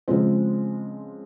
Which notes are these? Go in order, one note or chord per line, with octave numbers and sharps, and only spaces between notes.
C#3 F3 G#3 C4